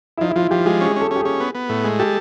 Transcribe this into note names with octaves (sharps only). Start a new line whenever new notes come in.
E4
F3 D#4
E4
F3 F4
F3 G4
G#3 G4
C#4 G#4
C#4 A4
C#4 G4
G#4
C#4
B3
B3
A2
G#3
G4 A4